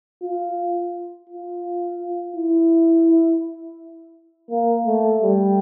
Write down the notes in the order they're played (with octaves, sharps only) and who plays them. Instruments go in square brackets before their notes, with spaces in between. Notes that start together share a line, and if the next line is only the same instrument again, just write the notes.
[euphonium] F4
F4
E4
A#3
A3
G3